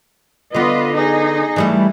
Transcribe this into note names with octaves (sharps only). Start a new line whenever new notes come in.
D3 B3 F4 B4 D#5
D#4 G#4
E3 G3 A3